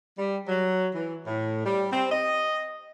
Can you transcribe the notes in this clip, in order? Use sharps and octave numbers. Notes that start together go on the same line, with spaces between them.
G3
F#3
E3
A2
G3
C4
D#5